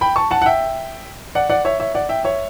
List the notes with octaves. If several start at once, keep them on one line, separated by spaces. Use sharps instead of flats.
G5 B5
A5 C#6
F#5 A5
F#5
E5 G5
D5 F#5
D5 F#5
C#5 E5
C#5 E5
D5 F#5
E5 G5
C#5 E5